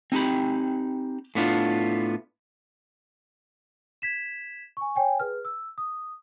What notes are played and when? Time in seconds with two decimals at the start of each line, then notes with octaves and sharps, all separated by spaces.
0.12 C4 D#4 G4 B5
1.35 A2 B3 D4 F4
4.02 G#6 B6 E7
4.77 G#5 C#6
4.96 C#5 G5 G#5
5.20 G#4 B4 F6
5.45 E6
5.78 D#6